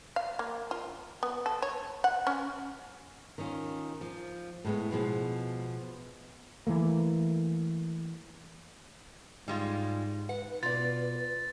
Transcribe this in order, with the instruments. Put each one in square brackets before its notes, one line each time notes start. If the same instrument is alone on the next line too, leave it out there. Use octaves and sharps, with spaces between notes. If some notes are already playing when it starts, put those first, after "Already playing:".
[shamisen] F5
A#3
F4
B3
A4
C#5
F#5
C#4
[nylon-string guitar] D#3 C#4 F4
F3
A2 G#3 B3
B2 F3 G3 G#3
[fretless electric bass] E3 A3 A#3
[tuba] G#2 [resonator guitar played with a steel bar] G3 G#3 F4
[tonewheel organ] B4 [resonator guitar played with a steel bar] F#5
[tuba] B2 [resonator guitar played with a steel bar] F4 D5 [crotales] A6